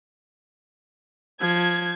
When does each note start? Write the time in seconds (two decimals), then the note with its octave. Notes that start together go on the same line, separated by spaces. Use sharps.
1.40 F3 G#6